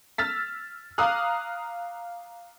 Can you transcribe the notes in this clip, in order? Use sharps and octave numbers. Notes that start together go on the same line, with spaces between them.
E6 F6 A6 B6
F5 A#5 D6 D#6 F6 F#6